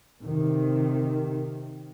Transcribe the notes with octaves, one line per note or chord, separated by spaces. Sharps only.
C3 D#3